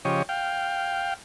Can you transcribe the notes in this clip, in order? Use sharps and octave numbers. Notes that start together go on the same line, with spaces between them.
C#3 F3 G4 C#5 D#5
F5 G5